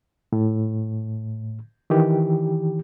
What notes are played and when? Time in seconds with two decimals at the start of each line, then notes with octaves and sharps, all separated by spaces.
0.32 A2
1.90 D#3 E3 G4